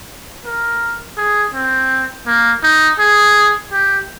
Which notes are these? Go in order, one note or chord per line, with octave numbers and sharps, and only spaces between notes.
A#4
G#4
C4
A#3
D#4
G#4
G4